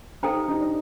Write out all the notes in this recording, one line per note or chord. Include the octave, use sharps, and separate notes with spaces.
D#4 A4 C5 G5 A#5
G4
D#4
D4